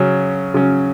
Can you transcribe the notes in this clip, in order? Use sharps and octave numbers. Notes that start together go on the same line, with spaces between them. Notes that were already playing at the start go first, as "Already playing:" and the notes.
Already playing: C#3 F#3 C#4
C#3 F#3 C#4